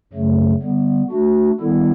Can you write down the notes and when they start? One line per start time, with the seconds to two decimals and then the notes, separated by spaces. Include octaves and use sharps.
0.13 F#2 C#3 F#3 A3
0.62 D3 G3 B3
1.10 A3 D4 F#4
1.60 D#3 G3 B3 E4 A4